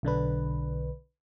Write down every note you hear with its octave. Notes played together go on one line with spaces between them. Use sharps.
B1 D3 D4 B4